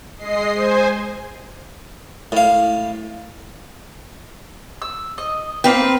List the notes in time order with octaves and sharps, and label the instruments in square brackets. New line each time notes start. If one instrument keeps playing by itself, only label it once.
[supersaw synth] G#3 D#5 C7
C5 G#5
[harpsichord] A2 F5
[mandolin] E6
D#5
[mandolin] A#3 G5 [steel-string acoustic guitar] C4 B4